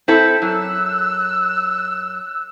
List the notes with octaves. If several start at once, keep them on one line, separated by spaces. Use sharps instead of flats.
C4 E4 A4
F#2 E6 F#6